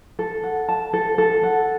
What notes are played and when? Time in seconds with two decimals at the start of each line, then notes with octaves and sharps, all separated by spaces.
0.19 A4
0.43 F#5
0.68 A5
0.93 A4
1.18 A4
1.43 F#5